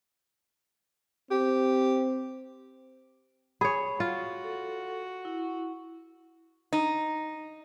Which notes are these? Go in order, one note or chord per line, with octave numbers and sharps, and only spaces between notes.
C4 G4
G#4 C#5 B5
F4 F#4
A4
E4
D#4